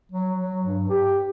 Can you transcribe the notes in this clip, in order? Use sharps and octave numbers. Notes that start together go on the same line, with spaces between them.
F#3
F#3
G2
G4